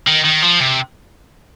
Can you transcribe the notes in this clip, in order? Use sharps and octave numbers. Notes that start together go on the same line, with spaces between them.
D#3
D#3
F3
C3